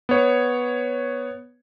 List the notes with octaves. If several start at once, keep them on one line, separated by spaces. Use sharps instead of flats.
B3 C#5